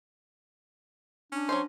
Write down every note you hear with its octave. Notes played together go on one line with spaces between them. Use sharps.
C#4 D4
F#3 A3 C5